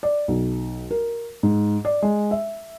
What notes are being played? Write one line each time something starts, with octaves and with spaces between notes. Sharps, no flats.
D5
B1
A#4
G#2
D5
G#3
E5